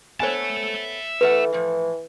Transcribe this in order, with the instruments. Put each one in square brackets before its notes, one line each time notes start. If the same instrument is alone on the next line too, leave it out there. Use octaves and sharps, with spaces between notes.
[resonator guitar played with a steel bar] B3 A4 C#5 [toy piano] C5 G#5 [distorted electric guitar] E5 A5
[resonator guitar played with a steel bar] E2 A3 F#5 [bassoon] E3 [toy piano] B4
[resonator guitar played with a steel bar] A2 F3